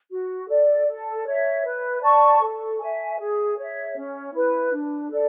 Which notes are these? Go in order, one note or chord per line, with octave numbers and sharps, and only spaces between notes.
F#4
A4 D5
A4
C#5 E5
B4
D5 A5 C#6
A4
E5 G#5
G#4
C#5 E5
C#4
E4 B4
D4
A4 D5